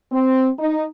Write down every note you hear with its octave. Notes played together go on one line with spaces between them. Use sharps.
C4
D#4